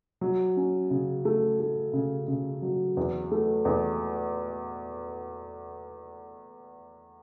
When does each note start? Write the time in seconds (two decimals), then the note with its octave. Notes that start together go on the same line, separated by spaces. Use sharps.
0.21 F#3
0.57 C#4
0.90 C#3
1.25 A3
1.60 A3
1.93 C#3
2.28 C#3
2.62 F#3
2.97 E2
3.31 A3
3.65 E2